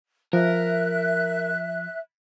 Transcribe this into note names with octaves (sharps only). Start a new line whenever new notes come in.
F3 A#4 E5 F#6